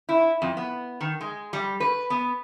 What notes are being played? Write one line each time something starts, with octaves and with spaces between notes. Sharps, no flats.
E4
F2
B3
D#3
G#3
G3
B4
B3